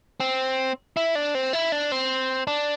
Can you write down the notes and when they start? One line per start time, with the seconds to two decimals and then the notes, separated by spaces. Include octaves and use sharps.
0.20 C4
0.97 E4
1.15 D4
1.35 C4
1.53 E4
1.72 D4
1.92 C4
2.47 D4